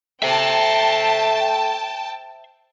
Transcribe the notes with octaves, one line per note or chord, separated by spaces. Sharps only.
A3 C5 E5 G5 A5